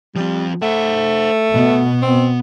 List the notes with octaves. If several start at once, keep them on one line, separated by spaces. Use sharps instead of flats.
F3 G3 C4
A3 C5 F#5
B2 B3
C4